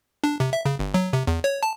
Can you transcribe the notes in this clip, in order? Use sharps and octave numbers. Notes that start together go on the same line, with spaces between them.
D4
C3
E5
C#3
G1
F#3
C3
E2
C#5
A5